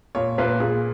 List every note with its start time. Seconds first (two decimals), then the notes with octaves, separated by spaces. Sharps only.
0.15 A#2 C#5
0.38 A#2 B4
0.60 A#2 G#4